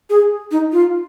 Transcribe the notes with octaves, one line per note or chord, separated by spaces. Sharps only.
G#4
D#4
F4